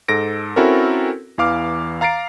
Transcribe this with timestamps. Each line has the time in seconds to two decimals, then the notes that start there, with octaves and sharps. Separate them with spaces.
0.08 G#2 A4 A#6 D7
0.56 C4 C#4 E4 F#4 A4 A#4
1.38 E2 E3 F5 D6 F6
2.01 F5 A#5 A6 C7 D7